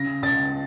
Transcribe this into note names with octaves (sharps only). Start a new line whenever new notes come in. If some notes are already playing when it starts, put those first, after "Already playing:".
Already playing: C#3 A#6
C#2 A6